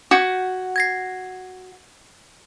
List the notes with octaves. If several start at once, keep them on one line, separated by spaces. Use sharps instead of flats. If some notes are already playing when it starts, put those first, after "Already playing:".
F#4 F#5 G6 G#6
G#6 A#6 C7